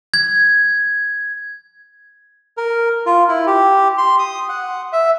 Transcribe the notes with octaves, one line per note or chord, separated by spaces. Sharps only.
G#6
A#4
F4
E4
G4
C6
D#6
F#5
E5